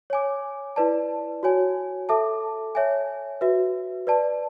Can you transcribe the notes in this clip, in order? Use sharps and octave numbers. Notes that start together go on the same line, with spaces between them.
C#5 G#5 D6
E4 B4 D5 A5
F#4 C#5 G#5
A4 E5 A5 D6
C#5 E5 G#5
F#4 B4 E5
B4 D5 A5